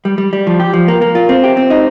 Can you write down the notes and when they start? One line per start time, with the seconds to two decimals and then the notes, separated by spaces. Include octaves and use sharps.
0.05 G3
0.18 G3
0.33 G3
0.47 F3
0.60 G4
0.73 F3
0.88 A#3
1.02 A#3
1.15 F4
1.29 C4
1.44 G4
1.57 C4
1.70 D#4